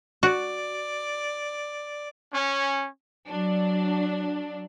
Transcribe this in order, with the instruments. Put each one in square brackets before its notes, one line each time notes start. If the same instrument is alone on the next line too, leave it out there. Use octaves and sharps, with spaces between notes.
[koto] F#4 [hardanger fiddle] D5
[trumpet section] C#4
[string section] F#3 D4